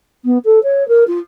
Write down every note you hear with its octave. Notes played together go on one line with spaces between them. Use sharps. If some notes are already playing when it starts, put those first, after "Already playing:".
B3
A4
C#5
A#4
F4